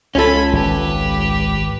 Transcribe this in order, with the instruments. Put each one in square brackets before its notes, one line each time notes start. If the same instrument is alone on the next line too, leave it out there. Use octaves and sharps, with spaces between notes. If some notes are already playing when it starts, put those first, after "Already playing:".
[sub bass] C#2 [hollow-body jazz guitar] C#4 F4 A4 [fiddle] G#5 B5
[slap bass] G#1 [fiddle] G4 B4